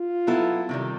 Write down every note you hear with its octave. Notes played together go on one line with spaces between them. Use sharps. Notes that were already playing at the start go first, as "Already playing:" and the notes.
Already playing: F4
F#3 B3 E4 A4
C3 D#3 G3